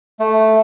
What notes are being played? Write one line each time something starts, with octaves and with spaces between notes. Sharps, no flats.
A3